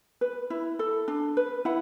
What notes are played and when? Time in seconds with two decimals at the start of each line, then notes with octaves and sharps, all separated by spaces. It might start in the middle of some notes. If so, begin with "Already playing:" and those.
0.21 B4
0.50 E4
0.79 A4
1.08 D4
1.37 B4
1.65 E4 F#5